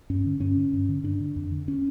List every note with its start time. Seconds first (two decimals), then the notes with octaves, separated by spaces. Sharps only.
0.10 G2 C#4
0.26 D3
0.40 G2 C#4
0.56 D3
0.73 G2
0.89 D3
1.04 G2 D4
1.20 D3
1.36 F2
1.51 D3
1.68 C#4